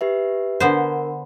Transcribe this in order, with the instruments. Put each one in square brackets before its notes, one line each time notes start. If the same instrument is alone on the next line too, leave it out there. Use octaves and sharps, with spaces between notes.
[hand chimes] G4 B4 E5
[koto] D3 B3 C5 [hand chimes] A#4